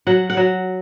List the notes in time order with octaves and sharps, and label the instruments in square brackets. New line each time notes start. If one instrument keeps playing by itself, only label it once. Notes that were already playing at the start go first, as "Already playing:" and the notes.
[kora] F#3 F#5
F#5
F#3